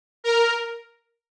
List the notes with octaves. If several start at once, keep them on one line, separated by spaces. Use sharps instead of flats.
A#4